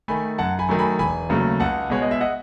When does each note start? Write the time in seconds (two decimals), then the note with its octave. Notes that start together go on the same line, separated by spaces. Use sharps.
0.08 D#3 A3 G#5 B5
0.38 F#2 F#5 A5
0.59 G#5 B5
0.69 D#3 F#3 A3
0.79 G#5 B5
0.99 E1 G#5 B5
1.29 D#2 C#3 F#3 A3
1.60 C#2 F#5 A5
1.90 B2 G#3 C#5
2.02 D#5
2.11 E5
2.21 D#5 F#5